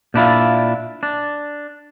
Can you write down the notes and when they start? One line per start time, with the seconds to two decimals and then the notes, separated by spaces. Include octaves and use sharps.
0.14 A#2 D4 E4 F4
1.03 D4